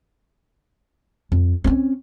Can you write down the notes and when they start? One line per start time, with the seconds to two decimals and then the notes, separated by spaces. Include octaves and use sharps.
1.32 F2
1.64 C4 C#4